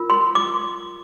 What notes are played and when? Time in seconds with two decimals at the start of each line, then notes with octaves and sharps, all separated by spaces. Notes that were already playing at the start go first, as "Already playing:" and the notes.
Already playing: F4 A#4
0.10 C6
0.35 D6